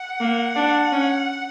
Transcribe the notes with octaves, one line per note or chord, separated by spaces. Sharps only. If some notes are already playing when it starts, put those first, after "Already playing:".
Already playing: F#5
A#3
D4
C#4